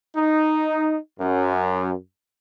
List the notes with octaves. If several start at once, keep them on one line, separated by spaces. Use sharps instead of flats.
D#4
F#2